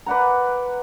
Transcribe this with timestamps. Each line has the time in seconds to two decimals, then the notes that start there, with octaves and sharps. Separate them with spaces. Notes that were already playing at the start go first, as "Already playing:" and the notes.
0.06 B4 D5 F#5 A#5